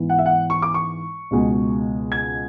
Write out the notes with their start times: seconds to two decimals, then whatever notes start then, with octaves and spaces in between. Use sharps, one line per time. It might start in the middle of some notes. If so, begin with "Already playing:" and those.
Already playing: G#2 E3 B3 E4
0.09 F#5
0.18 E5
0.26 F#5
0.50 C#6
0.62 D6
0.74 C#6
1.31 C#2 B2 G#3
2.12 G#6